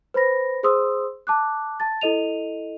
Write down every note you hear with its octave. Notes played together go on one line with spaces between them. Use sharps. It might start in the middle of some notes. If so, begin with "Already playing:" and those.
B4 C5 B5 A#6
G#4 C5 C6 D#6 E6
A5 D6 F#6
A5 A6
E4 A4 D#5 D#7 F7